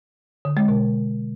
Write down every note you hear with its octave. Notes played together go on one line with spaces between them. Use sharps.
D3
G#3
B2